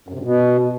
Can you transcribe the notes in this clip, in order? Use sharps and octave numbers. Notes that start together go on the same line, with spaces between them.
F#2
C3
G2
B2